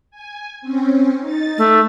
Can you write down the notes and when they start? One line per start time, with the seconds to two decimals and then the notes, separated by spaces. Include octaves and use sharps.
0.11 G#5
0.61 C4 C#4
1.19 D#4 A6
1.58 A3